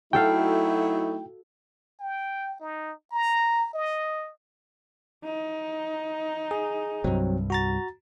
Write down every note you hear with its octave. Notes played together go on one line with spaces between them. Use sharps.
F#3 A3 D#4 E4 F#4 A4 F5 G5
G5
D#4
A#5
D#5
D#4
G#4
C2 G2 F#3 C4
F#4 A#5 A6